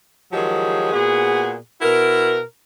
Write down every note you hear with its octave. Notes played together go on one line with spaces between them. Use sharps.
D#3 F3 F#3 G#3 G4 G#4
A#2 B3 F#4 G#4
B2 E4 F#4 A#4